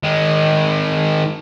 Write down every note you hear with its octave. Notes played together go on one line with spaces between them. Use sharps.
D#3 G#3